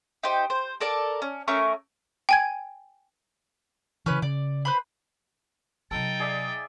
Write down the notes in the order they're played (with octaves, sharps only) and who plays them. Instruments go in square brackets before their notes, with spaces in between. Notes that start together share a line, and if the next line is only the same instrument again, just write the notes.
[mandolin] D#4 G4 C5
C5
A4 A#4 D5 A5
C#4
A3 C#4 A#4 C#6
[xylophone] G5 G#5 G#6
[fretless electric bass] C#3 E3 [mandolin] C#4 B4 F#6
[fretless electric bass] C#3 [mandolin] D5
[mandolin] B4 C5 B5
[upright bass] C3 F#3 [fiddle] D#4 G5 [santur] A4 [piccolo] A6
[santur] G#4 D5 E5